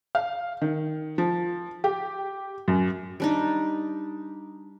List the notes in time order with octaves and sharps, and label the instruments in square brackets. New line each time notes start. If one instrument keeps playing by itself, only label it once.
[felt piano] F5
D#3
F3
G4
F#2
[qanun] G3 D4 D#4